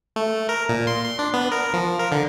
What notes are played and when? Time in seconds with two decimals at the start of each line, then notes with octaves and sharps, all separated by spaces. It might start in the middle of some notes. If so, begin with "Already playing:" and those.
0.16 A3
0.49 A#4
0.69 A#2
0.87 C6
1.05 C6
1.19 D4
1.34 B3
1.52 A#4
1.73 F3
1.99 A#4
2.12 D3